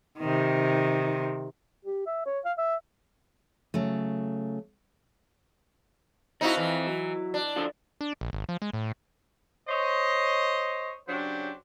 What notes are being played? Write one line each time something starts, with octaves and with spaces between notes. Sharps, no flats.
C3 D#3
G4
E5
C#5
F5
E5
C#3 F#3 A3
F2 C4 D#4 E4 F#4 F5
E3
F#3
D4
D3 F3 F4
D4
A#1
G#1
F3
G#3
A2
C5 C#5 D#5
C#3 F#3 C#4 D4 G4 C5